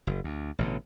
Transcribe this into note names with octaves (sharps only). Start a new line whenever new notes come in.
F#1
D2
A1 B2 D3